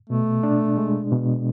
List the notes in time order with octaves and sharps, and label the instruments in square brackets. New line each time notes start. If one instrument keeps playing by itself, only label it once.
[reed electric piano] B2 [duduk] A3
[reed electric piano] D4
G#3
B2